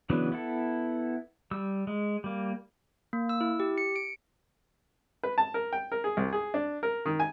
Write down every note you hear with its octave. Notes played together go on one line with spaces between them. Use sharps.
C#3 E3 F#3 B3 D4
B3 E4 A4
G3 E6
G#3
G3 A#3
A#3
E6
E4
G4
C#7
D7
B4
A5
A#4
G5
A#4
G#4
C2
G#4
D4
A#4
D#3
G#5